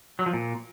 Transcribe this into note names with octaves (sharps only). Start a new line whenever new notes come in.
F#3
F3
A#2